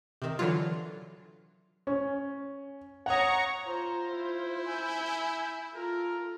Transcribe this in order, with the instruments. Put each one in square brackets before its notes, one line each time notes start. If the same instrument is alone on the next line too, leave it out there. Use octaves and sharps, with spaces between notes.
[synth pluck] C3 D#3
D3 E3 F#3 F4
[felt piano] C#4
[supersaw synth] C#5 A#5 C#6 [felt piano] F#5 D#6
[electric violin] F4 C5 [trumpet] A#5
[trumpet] E4
[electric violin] G#5 G6
[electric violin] F4 A4 [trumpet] A#4